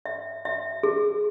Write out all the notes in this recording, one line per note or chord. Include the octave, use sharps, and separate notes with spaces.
E5
E5
G#4